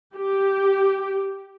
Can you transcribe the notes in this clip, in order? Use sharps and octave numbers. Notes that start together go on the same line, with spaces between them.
G4